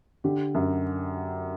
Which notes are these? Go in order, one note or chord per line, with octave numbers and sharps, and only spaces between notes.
D3 G4
F#2